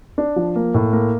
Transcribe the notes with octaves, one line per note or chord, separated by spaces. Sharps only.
D4
F3
A#3
A2
A#3